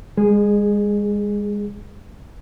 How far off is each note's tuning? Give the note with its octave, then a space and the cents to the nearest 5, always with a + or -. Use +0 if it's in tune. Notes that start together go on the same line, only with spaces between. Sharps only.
G#3 -30 G#4 +0